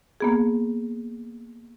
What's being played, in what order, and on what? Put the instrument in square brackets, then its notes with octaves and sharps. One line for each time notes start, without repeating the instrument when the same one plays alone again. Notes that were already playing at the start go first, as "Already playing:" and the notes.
[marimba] A#3 B3 G#4